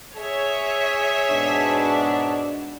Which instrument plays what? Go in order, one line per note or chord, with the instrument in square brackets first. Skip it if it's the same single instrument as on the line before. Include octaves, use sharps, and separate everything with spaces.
[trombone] G#4 [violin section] C#5 E5
[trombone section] G#2 B2 [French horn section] D4